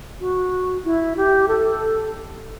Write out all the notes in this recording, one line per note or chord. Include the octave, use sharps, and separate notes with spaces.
F#4
E4
G4
A4